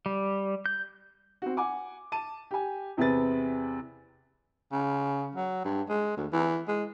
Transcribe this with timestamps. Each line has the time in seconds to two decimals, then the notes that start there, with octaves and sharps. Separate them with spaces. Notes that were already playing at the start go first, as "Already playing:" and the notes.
0.06 G3
0.66 G6
1.42 C4 F#4
1.57 F#5 G#5 D6
2.12 A5 D#7
2.51 G4 G#5
2.97 E2 C3 C4 G#4 B4 A6
4.72 C#3
5.35 F#3
5.64 G2
5.89 G#3
6.17 D2
6.32 E3
6.68 G#3